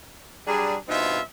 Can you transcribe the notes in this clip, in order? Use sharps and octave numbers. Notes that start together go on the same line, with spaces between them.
F#3 G3 D4 G#4
G2 B2 C4 D#4 F4 E5